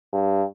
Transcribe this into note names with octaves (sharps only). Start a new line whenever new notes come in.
G2